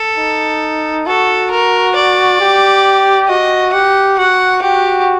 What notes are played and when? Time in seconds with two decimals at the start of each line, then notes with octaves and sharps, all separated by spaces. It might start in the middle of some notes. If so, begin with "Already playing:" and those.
Already playing: A4
0.18 D#4
1.07 F#4 A4
1.51 A#4
1.96 D5
2.41 G4
3.28 F#4 D#5
3.73 G4 F#5
4.18 F#4 F#5
4.62 F#4 G4